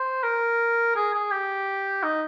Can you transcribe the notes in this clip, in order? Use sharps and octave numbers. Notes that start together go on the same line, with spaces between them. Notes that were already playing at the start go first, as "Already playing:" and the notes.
Already playing: C5
A#4
G#4
G#4
G4
D#4